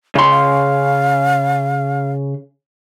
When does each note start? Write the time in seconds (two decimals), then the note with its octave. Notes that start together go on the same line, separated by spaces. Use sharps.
0.15 C#3 B5 C6
0.31 F5